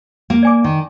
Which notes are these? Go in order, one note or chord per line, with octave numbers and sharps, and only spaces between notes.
A#3
D5 G#5 D6
D#3